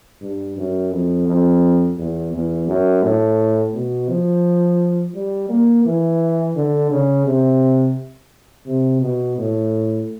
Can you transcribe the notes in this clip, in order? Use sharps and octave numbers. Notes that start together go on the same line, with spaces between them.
G2
F#2
F2
F2
E2
E2
F#2
A2
B2
F3
G3
A#3
E3
D3
C#3
C3
C3
B2
A2